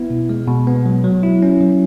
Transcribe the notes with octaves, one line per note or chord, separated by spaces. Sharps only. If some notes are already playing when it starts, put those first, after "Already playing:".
Already playing: B3 E4
B2
G#3
B2
B3
F#3
F#3
E4
C#4
F#3